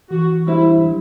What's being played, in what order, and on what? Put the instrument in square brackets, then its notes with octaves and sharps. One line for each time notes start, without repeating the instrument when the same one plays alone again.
[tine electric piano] E3 [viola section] F#4
[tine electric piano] G3 D4 G4 C5 [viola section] E4
[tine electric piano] F#3